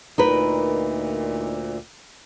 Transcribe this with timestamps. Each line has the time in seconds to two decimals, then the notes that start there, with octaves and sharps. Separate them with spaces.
0.18 D2 A#2 D#4 A#4 B4